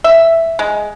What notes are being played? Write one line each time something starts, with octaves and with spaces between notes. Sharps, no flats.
E5
G#3